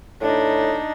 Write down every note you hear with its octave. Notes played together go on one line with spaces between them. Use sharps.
A2 D4 D#4